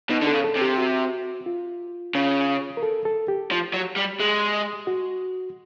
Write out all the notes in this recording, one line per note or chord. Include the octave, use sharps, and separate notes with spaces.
B2 D#4
D3
A4
C#3
A4
C3
G4
F#4
F4
C#3
A#4
A4
A4
G4
F3
F#3
G3
G#3
F#4